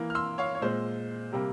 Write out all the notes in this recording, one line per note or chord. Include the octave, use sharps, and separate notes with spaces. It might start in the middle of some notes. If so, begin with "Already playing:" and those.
Already playing: E3 A#3
F6
C6 E6
C#5 F5
C#5
A#2 G#3 C5
C3 G3 A#3